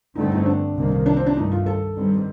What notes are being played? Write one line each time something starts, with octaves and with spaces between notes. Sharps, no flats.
G2 D3 A3 C4 D#4
D#4
C4
D4
C2 C3 D#3 A#3
D4
C4
D4
G2 D#3 A3 D#4
F4
A4
G2 D#3 G3 C4